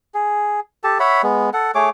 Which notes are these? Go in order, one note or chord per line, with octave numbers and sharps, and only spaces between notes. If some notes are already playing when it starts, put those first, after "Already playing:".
G#4
G4 A4 A5
C#5 E5 F#5 B5
G#3 B3
A4 F#5
A3 G#4 C#5 D6